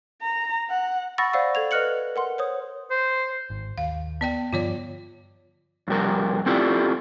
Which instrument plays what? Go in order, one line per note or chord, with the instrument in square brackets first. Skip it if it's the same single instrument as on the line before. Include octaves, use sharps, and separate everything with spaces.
[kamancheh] A#5
F#5
[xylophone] F#5 B5 C#6 E6 A6 A#6
C5 D5 F5 F#5 E6
A4 G#6 F7
B4 D#5 F6 F#6 C#7 F#7
A#4 F#5 C6
C5 C#5 D#6
[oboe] C5
[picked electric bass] G#1
[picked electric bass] D#2 [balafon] F5
[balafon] B3 D5 G5
[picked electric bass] G2 D3 F3 [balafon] F4 C#5 D5
[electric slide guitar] F2 C3 G3 A#4
C4 E4 F4 G4 A4 D5